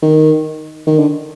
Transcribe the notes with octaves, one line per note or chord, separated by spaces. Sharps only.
D#3
D#3
D3